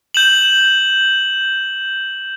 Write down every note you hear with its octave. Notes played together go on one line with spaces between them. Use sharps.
G6 E7 F#7